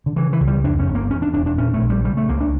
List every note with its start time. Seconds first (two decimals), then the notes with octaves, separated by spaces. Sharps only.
0.06 D3
0.16 C#3 E3
0.33 E3
0.41 C#2
0.47 G3
0.64 F2 D4
0.79 C#4
0.87 G1
0.95 A#3
1.10 E2 C#4
1.22 D4
1.34 E1 D4
1.46 D4
1.58 A#2 C#4
1.74 A3
1.81 A#1
1.90 G3
2.04 C#3 G3
2.17 A3
2.29 C#2 A#3
2.41 D4